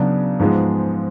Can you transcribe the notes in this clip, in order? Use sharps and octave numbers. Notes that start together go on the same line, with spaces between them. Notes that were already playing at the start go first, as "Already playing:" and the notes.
Already playing: C#3 F#3 B3 D4
G#2 F3 G#3 B3